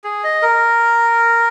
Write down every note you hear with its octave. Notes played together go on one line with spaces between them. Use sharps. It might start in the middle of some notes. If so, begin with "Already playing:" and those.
G#4
D#5
A#4